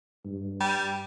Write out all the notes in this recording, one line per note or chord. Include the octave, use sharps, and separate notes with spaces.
G2
G3